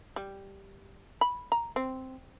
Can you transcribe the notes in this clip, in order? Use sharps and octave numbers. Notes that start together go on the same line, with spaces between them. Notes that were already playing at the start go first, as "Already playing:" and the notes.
G3
B5
A#5
C4